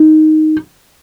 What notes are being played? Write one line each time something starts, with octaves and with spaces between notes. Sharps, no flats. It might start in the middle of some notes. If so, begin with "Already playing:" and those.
Already playing: D#4